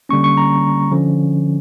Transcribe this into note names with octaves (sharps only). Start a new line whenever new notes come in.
D3 G3 A#3 C#4 C#6
C#6
A#5
D3 F3 C#4